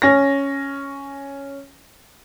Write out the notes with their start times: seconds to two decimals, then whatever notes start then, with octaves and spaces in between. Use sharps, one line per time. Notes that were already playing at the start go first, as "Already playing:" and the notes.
0.02 C#4 A#6